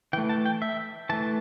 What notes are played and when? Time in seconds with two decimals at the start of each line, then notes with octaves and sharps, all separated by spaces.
0.13 E3 G5
0.18 A3
0.29 A5
0.46 G5
0.62 E5
1.09 E3 A5
1.12 A3